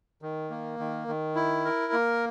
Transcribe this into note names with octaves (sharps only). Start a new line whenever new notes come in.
D#3
A#3
D#3
D#3
E4
A#4
A#3